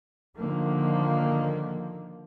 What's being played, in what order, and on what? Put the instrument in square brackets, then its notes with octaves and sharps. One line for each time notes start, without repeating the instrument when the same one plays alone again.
[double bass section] D3 D#3 F3 A#3